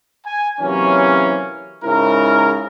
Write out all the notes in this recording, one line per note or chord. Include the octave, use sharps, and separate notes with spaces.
G#5
C3 E3 F#3 A#3 C#4
G#2 C#3 E4 A#4